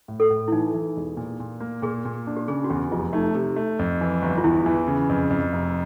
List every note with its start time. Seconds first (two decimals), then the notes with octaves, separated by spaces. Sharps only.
0.08 A2
0.20 A4
0.30 A2
0.48 E4
0.52 E3 D#4
0.74 E3
0.96 E1
1.17 A#2
1.40 A#2
1.60 A#3
1.82 A#2 G#4
2.05 A#2
2.27 D4
2.37 G4
2.48 C#3 G#4
2.64 F#4
2.70 E2 G4
2.92 F1 F4
3.13 A3 D#4
3.35 C3
3.56 A3
3.79 F2
4.01 E3
4.22 G1
4.38 F4
4.44 E2 E4
4.66 E3
4.88 C#3
5.09 F2
5.30 F2
5.53 F1